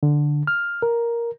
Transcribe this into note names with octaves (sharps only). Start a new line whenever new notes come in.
D3
F6
A#4